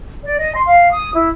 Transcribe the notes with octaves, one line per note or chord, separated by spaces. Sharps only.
D5
D#5
C6
F5
D#6
E4